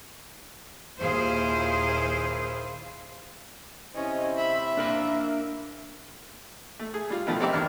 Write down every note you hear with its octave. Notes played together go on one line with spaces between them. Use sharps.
D#2 A#2 E4 G#4 C5 F5
C3 C#4 E4 C5 D#5
E5 B5
A#3 D4 A#4 B5
A3
G#4
G3 F4
B2 D#3 F3 A3
B3 C4 D#4 G4 D5 E5
E2 D#3 D4 F6